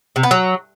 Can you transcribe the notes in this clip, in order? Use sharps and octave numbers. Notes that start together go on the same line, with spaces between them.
C3
B3
F#3